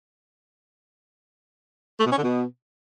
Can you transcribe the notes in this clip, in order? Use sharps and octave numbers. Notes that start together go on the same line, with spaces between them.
A3
B2
C#4
D3
B2